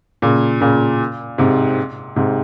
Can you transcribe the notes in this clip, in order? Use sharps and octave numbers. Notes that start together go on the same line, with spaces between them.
A#2 C#3
A#2 C#3
G#2 C3
G#2 C3